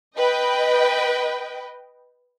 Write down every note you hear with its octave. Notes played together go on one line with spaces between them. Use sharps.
B4 D#5 G5